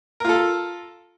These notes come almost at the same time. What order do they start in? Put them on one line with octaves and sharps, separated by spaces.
A#4 F4 A4